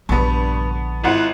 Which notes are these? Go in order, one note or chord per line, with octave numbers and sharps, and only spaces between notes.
A#1 G2 D3 B3 A5 B5 C#6
G#1 E4 F4 F#5